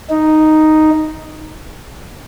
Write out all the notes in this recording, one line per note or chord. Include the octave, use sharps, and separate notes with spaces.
D#4